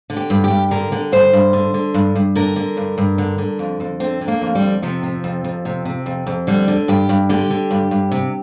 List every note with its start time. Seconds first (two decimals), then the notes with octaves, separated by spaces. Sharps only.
0.10 D3
0.17 G4
0.30 G2
0.44 G4
0.50 G2
0.71 D3 A#4
0.92 D3
1.12 G2 C5
1.33 G2
1.53 D3
1.74 D3
1.94 G2
2.15 G2
2.35 D3 A#4
2.56 D3
2.77 G2
2.98 G2
3.18 D3
3.38 D3
3.59 F2
3.80 F2
4.00 D3 C4
4.21 D3
4.28 A#3
4.42 F2
4.55 G3
4.62 F2
4.82 C3 F3
5.03 C3
5.24 F2
5.44 F2
5.65 C3
5.85 C3
6.06 F2
6.27 F2
6.47 D3 G3
6.68 D3
6.88 G2 G4
7.09 G2
7.29 D3 G4
7.50 D3
7.71 G2
7.91 G2
8.11 C3